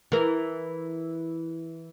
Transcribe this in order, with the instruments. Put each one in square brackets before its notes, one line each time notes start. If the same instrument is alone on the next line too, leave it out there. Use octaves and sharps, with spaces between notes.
[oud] E3 A#4